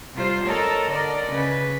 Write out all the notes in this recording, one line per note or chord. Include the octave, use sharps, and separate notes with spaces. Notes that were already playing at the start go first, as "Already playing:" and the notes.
C3 G3 F4 C5
A4 A#4 C#5 D#5 A5 A#5
D3 A#4 D5 D#5
C#3 B4